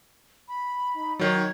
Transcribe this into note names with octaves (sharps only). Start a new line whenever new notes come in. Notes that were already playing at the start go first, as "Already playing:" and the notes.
B5
D#4
D#3 F#3 C#5